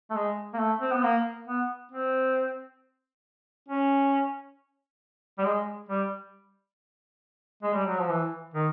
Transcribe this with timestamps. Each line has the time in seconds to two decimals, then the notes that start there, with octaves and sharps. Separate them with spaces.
0.10 A3
0.15 G#3
0.53 A#3
0.59 A3
0.81 C4
0.93 B3
1.03 A#3
1.48 B3
1.92 C4
3.68 C#4
5.38 G3
5.45 G#3
5.89 G3
7.63 G#3
7.74 G3
7.86 F#3
7.98 F3
8.09 E3
8.54 D#3